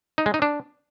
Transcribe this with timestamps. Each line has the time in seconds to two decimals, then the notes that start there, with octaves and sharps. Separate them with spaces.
0.18 D#4
0.26 G#3
0.34 D#4
0.42 D4